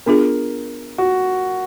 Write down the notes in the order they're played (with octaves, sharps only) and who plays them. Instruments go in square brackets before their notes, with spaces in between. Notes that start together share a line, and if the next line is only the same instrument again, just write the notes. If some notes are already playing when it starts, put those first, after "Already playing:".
[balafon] B3 D4 F4 G#4 [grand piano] A#4
[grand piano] F#4